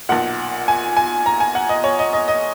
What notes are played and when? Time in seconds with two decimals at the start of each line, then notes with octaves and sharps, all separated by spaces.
0.09 B1 A#2 F#5
0.68 G#5
0.97 G#5
1.26 A#5
1.40 G#5
1.55 F#5
1.69 D#5
1.84 C#5
1.99 D#5
2.13 D#5
2.28 D#5